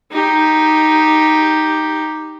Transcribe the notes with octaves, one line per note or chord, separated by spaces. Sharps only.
D#4 G4